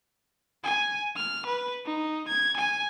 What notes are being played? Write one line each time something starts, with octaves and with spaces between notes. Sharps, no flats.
G#5
F6
B4
D#4
G#6
G#5